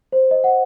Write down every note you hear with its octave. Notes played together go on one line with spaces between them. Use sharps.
C5
D#5
F#5